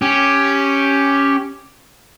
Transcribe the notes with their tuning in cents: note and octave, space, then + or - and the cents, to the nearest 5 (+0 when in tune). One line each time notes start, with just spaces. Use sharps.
C#4 +0 G4 +0